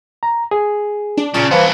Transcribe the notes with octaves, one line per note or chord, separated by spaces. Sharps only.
A#5
G#4
D4
A#2 C#3 A5
E3 B3 D4 C5 F5